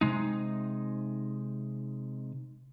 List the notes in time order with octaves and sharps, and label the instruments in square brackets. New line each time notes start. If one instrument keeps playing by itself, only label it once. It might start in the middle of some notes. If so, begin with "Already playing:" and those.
[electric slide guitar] C3 G#3 D#4